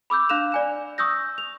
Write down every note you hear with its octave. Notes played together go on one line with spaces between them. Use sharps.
B5 D6 E6 G6
D4 F5 F#6 E7 F7
D5 G#5 E7
C#6 D#6 E6 G6 A#6
F7